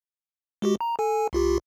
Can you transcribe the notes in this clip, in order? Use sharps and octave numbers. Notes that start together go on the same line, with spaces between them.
G#3 F#4 G4
A#5
A4 G#5
C2 F4 G4